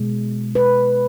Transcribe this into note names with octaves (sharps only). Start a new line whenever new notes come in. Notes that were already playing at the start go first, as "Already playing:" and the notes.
Already playing: B2 G#3
B4